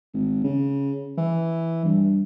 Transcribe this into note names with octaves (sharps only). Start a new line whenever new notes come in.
G#1
C#3
E3
G2